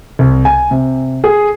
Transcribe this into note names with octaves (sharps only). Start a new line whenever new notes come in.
C2
G#5
C3
G#4